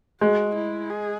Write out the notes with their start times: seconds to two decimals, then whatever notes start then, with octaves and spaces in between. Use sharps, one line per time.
0.21 G#3 F#4
0.55 E4
0.89 G#4